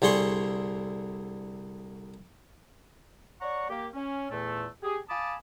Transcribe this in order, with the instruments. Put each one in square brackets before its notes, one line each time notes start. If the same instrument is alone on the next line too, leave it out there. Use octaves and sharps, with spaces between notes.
[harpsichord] C2 D3 G#4 C6 C#6
[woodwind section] C#5 D5 F#5 A#5 C#6
A#3 G4
C#4
E2 A#2 A3
G4 G#4
F5 G#5 A5 B5 D6 D#6